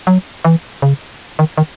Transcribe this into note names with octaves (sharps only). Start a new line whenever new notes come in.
F#3
E3
C#3
D#3
D#3